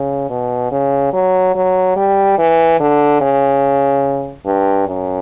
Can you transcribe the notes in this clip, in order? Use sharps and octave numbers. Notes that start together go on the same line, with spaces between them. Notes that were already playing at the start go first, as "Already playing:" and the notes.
Already playing: C#3
B2
C#3
F#3
F#3
G3
E3
D3
C#3
G2
F#2